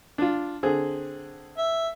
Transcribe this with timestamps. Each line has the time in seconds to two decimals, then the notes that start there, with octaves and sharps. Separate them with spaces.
0.18 D4 F4
0.63 D3 C4 G#4
1.58 E5